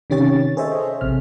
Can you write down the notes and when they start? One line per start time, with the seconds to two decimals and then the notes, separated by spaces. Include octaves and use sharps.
0.10 C3 D#3 C#4 G4 C#5 A6
0.57 G#4 A4 C5 C#5 D#5 E5
1.01 A1 C3 F6